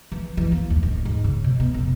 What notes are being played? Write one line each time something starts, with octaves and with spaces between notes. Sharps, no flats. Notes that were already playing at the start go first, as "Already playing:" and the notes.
E3
E3
A#3
D#2
D1
G#2
C#3
B2
B3
F1